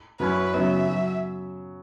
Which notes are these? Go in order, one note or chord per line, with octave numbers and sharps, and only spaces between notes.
F#2 F#3 C#4 E4 B4
C#3 F#3 B3 E5
F#3